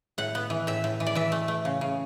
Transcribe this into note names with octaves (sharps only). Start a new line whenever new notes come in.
A2 F#5
B3
E3
A2 E5
A2
E3
D5
E3 E5
A3
A3
C#3
C#3